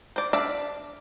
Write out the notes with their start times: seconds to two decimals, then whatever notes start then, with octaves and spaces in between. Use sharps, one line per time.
0.16 C5 D5
0.33 D4 D5 E5 F5